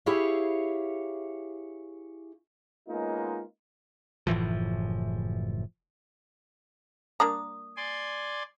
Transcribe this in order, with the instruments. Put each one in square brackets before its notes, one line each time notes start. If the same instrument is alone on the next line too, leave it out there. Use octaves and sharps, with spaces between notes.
[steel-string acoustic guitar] E4 G4 G#4 C#5 E5 F5
[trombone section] G#3 A#3 B3 C#4 D#4 F4
[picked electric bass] F#1 A2 E3 F3
[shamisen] A#3 D4 A#5 [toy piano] D#6
[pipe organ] D5 G#5 C6